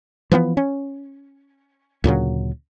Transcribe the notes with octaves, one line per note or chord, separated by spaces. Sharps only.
E3 F3 A#3 B3
C#4
D2 A#2 C#3 F#3